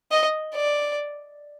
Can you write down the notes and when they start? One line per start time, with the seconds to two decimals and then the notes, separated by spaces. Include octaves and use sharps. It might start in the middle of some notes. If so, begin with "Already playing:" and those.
0.12 D#5
0.55 D5